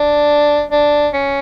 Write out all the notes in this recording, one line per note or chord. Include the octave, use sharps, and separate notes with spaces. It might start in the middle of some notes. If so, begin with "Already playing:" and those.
Already playing: D4
D4
C#4